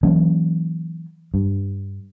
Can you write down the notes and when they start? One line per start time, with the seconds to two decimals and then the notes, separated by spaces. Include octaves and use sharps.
0.03 E3 F#3 A#3 C#4
1.34 G2